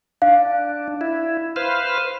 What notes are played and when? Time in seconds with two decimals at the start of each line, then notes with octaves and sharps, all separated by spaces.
0.22 D4 F5
1.01 E4
1.56 B4 C5 F5